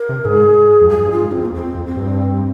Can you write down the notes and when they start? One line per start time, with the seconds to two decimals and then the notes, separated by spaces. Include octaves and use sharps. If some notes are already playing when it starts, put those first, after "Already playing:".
Already playing: A#4
0.09 C3
0.25 G#2 G#4
0.82 F2
0.89 G2 G#4
1.05 G2
1.11 F4
1.21 G#2
1.32 C4
1.37 F2
1.45 A#3
1.53 F2 C4
1.75 F2
1.86 C4
1.97 G2